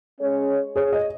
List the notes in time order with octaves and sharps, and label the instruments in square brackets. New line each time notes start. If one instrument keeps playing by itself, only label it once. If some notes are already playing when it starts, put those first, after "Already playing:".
[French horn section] G#3 C#4 G#4 C#5
[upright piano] G#4 C#5
D#5